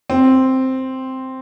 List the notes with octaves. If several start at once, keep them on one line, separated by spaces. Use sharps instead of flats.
C4